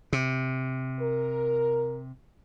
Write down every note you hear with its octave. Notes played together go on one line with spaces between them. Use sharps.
C3
A#4